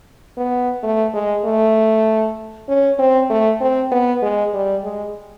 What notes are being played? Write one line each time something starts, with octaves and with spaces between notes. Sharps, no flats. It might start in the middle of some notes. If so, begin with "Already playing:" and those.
B3
A3
G#3
A3
C#4
C4
A3
C4
B3
G#3
G3
G#3